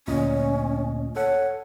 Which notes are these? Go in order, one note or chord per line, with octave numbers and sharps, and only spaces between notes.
D2 A#2 C#4 D#5
A4 C#5 F#5